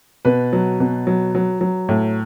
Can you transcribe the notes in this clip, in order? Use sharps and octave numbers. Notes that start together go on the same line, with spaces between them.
B2 B4
F#3
B2
F#3
F#3
F#3
A2